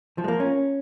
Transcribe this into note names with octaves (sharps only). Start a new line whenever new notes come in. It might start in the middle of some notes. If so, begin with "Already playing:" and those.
F3
G#3
A#3
C#4